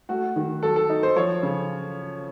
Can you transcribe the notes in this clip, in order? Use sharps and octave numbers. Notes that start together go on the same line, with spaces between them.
A3 F#4
D#3
F#3 A4
A4
D#4
C5
F3 C#5
C#3